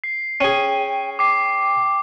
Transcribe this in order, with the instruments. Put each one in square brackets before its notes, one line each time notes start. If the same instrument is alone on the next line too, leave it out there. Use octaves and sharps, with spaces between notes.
[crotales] C7
[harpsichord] C#4 G#4 [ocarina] G5
[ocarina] G5 [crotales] D6 C7